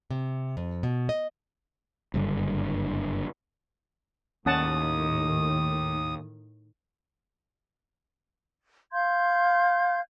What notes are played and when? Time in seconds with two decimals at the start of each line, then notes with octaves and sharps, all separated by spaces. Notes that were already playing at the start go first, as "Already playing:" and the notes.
0.10 C3
0.57 F2
0.83 B2
1.09 D#5
2.14 F#1 G2 D3
4.46 D#2 A2 D#3 C#4 F#5 A5 D#6
8.92 F5 C6 G6 G#6